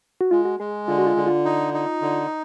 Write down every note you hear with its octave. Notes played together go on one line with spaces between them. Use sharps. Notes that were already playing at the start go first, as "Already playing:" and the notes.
F#4
G#3 F4
F#4
G#3 G#4
D3 F4
F#4
F4
D3
F4
D#4
D#4
D3